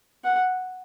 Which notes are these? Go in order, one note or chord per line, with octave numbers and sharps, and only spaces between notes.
F#5